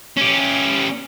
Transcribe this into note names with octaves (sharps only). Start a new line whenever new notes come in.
C#4 G4